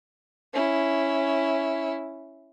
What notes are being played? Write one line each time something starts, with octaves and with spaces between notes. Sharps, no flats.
C#4 E4